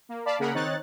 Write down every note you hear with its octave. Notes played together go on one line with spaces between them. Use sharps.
A#3
D5 F5 A5 B5 D6
C#3 A#3 G#4 A#4 F#5 B5
D#3 C4 D#4 C#5 F#6 A6